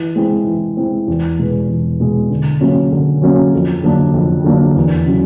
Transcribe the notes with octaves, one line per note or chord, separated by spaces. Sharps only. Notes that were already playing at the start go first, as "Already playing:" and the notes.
Already playing: E3
G#3 C4 E4
E3
G#3 C4 E4
E2
B2 G#3 B3
E2
B2 G#3 B3
D3
F#3 A#3 C#4 F#4
D3
F#3 A#3 C#4 F#4
F2
D3 F#3 A#3 D4
F2
D3 F#3 A#3 D4
E2
C#3 F#3